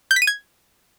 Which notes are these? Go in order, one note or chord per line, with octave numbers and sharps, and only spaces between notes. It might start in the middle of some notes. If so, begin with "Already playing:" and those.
G6
B6
D#7
G#6